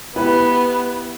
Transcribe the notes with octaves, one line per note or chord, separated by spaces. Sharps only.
B3 E4 G4 B4